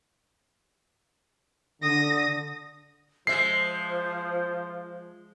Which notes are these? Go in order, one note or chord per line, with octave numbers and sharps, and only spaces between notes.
D3 D#6 A#6
F3 G#3 C5 E5 C7